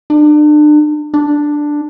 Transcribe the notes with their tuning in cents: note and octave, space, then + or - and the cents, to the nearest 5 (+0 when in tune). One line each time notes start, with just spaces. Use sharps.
D4 +35
D4 +5